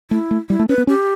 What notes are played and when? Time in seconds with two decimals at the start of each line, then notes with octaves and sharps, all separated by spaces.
0.11 A3 E4
0.31 A3
0.49 G3 E4
0.59 A3
0.69 C#4 B4
0.78 B3
0.87 C#4 G4